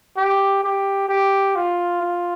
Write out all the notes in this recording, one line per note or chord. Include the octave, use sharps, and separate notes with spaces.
G4
G4
G4
F4
F4